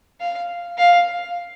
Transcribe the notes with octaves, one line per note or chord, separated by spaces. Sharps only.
F5
F5